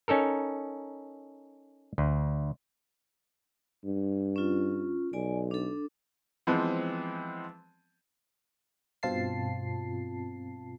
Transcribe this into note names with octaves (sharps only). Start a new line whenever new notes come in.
C#4 D#4 A4 A#4
D2
G2
C#4 F4
B1 D5 G#5
D4 A4
E3 F3 G#3 B3 C4
G2 B2 C4 F4 A5 C7